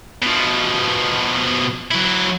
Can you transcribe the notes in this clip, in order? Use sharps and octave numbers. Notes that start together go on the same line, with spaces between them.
B2 F3
F#3 E4